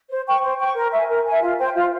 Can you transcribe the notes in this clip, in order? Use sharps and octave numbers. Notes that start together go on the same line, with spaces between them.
C5
G5 C#6
C5
G5 C#6
A#4
E5 G#5
A#4
E5 G#5
F4
C5 G5
F4